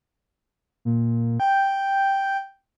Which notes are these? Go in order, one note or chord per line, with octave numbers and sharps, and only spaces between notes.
A#2
G5